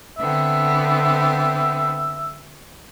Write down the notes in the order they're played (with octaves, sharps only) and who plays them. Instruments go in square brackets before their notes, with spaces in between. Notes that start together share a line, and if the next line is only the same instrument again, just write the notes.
[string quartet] D3 B3 C4 [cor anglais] E5